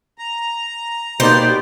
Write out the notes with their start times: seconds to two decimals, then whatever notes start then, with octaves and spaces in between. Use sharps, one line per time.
0.18 A#5
1.20 B2 A#3 B3 D#4 G4 C5 D5